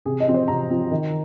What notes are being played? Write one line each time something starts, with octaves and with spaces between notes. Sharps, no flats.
C3 G#4
D#5
F3 C4
C5
C3 A#5
F3 C4
D#3